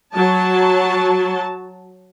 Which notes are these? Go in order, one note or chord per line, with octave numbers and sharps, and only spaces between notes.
F#3 A5